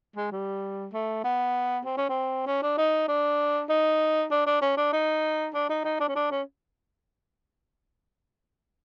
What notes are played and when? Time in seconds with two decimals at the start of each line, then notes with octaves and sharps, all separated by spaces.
0.16 G#3
0.32 G3
0.93 A3
1.24 B3
1.85 C4
1.97 C#4
2.09 C4
2.47 C#4
2.62 D4
2.78 D#4
3.08 D4
3.69 D#4
4.31 D4
4.46 D4
4.62 C#4
4.77 D4
4.93 D#4
5.54 D4
5.69 D#4
5.85 D#4
6.00 D4
6.08 C#4
6.16 D4
6.31 C#4